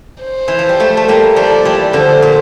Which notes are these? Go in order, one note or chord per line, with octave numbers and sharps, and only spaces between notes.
C5
E3
F3
G3
F3 A3
A3
G3 A#3
F3 A3 D5
E3 G3
D3 F3 C5
A#2